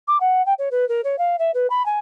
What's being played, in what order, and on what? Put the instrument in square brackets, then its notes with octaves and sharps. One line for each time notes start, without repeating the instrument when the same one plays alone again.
[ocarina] D6
F#5
G5
C#5
B4
A#4
C#5
F5
E5
B4
B5
G#5